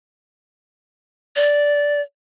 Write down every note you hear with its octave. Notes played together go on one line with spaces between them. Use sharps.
D5